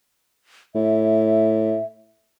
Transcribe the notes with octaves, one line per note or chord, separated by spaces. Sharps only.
A2 E5